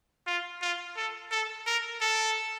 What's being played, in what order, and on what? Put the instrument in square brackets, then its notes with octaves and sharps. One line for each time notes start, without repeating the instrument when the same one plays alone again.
[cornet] F4
F4
A4
A4
A#4
A4